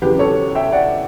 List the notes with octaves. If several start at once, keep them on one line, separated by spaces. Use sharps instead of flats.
E2 C#3 F#3 G4 B4
A4 C#5
E5 G5
D5 F#5